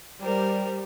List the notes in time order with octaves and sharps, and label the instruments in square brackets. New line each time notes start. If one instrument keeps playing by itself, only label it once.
[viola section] G3 [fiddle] A#4 C5